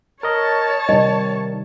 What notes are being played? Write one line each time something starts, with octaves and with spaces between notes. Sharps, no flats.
A#4 C#5 D#5 A5 C#6
C3 D#3 G3 D#5